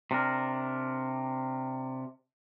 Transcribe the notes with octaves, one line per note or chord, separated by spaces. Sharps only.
C3 D4 A#4